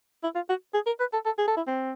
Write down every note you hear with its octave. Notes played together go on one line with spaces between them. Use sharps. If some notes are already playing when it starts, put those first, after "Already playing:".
E4
F4
F#4
G#4
A#4
B4
A4
A4
G#4
A4
E4
C4